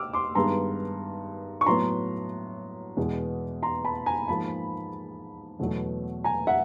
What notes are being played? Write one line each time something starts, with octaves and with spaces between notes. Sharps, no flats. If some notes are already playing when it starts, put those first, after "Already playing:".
Already playing: G5 D6 E6 F6
C6 D6
G2 D#3 G#3 B3 A#5 C6
C#6
A2 F#3 B3 A#5 C6
E2 B2 G#3
A#5 C6
A5 B5
G#5 A#5
G#2 F3 A#3 A5 B5
E2 B2 F#3 A3
G#5 A#5
E5 F#5